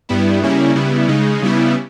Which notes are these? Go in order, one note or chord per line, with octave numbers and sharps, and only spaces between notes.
G2 G3 B3 E4
C#3 G3 A#3 C#4 E4
C#3 G3 B3 E4
C#3 G#3 D#4
C#3 G3 B3 E4